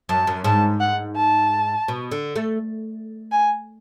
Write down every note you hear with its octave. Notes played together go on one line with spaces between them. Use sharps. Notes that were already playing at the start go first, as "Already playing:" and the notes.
F#2 A5
F#2
G#2 A5
F#5
A5
B2
D3
A3
G#5